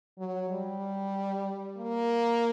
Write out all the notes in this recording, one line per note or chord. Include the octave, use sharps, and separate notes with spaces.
F#3
G3
A#3